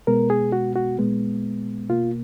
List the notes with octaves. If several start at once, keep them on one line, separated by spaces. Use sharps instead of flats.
B2 G#3 B3 A#4
G#4
F#4
F#4
A#2 G#3 B3
B2 A#3 F4